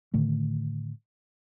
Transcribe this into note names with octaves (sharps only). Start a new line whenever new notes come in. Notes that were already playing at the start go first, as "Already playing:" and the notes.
A2 D3 D#3 A3